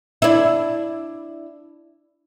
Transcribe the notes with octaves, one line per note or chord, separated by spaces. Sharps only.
D4 E4